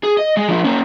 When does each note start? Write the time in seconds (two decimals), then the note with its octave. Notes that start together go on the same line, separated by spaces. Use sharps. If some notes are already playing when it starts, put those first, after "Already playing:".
0.04 G#4
0.17 D#5
0.37 G#3
0.48 F3 D4
0.64 A#3 C#4